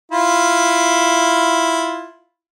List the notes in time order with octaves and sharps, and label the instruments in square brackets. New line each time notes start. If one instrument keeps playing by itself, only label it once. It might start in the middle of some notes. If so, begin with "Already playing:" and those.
[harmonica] E4 F4